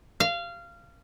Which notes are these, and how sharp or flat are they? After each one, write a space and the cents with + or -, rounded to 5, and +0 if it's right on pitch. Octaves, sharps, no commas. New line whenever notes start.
F5 -20